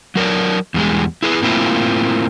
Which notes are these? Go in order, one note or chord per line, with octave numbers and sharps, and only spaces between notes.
F#3 A#4 C#5 D5
E2 G3 G#3
E4 G#4 B4
A2 A#3 C4 E4 F4